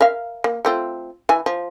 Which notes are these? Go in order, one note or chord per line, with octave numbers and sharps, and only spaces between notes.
A#4 E5 F5
A#3
A3 C4 F4
E3 G#5
F3